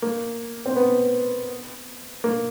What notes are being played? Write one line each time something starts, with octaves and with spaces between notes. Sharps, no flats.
A#3
C4
B3
A#3